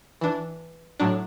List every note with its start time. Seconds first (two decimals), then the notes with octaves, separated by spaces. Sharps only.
0.21 E3 D4
1.00 A2 F#3 D4